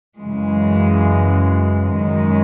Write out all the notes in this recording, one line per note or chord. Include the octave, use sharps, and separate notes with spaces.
F#2 C#3 E3 G#3
F#2 D#3 G#3